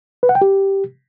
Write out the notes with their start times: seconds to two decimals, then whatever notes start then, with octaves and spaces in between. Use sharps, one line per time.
0.23 B4
0.29 F#5
0.35 G5
0.42 G4